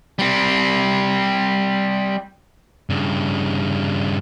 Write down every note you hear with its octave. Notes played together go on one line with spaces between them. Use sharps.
G3 C4
G2 C#3